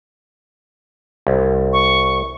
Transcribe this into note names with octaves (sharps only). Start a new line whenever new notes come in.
C2
C#6